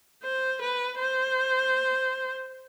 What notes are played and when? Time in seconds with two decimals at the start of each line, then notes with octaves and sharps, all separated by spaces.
0.23 C5
0.61 B4
0.99 C5